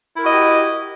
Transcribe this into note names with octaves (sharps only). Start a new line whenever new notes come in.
E4 F#4 G4 A#4 D#5